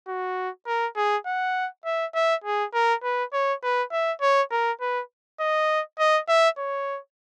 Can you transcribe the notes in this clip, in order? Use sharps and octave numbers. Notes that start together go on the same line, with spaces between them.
F#4
A#4
G#4
F#5
E5
E5
G#4
A#4
B4
C#5
B4
E5
C#5
A#4
B4
D#5
D#5
E5
C#5